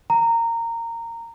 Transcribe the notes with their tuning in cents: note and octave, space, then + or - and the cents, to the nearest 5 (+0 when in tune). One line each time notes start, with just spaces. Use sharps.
A#5 -15